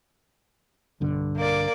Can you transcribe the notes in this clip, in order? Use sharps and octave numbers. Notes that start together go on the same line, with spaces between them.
B1 G2 D3
A#3 D5